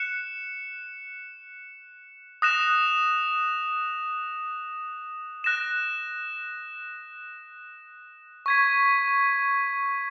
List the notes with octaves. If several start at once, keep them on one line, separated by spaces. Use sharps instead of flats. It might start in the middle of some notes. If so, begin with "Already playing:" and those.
Already playing: F#6 C#7 E7
D#6 F#6 A#6 E7
F#6 A#6 E7
C#6 G#6 B6